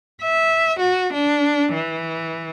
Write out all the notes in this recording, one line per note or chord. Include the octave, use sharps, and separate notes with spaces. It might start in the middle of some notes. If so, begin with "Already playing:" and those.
E5
F#4
D4
E3